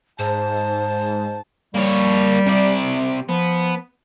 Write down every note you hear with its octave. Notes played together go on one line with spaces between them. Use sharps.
G#2 C5 A5
G3 A#3 C#5
C3 D5
F3 B3